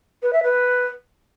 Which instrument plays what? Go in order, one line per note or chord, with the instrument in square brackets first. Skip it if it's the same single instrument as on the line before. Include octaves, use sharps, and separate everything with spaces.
[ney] B4
E5
B4